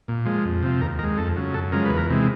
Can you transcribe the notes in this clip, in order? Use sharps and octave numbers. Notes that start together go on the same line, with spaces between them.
A#2
F3 G#3
F2
C3 F3
D#2 A#4
D#3 G#3 A#4
F2 A4
C#3 F#3
F#2 A4
C#3 F3 G#3 A#4
B4
E2
A#4
C3 E3 G#3